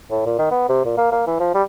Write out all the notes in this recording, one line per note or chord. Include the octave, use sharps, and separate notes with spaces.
A2
A#2
D#3
B3
C3
A#2
A#3
A#3
E3
F3
G3